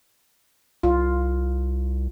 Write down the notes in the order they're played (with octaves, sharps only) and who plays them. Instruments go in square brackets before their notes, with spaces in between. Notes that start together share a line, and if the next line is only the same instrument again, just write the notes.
[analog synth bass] C2 [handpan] F4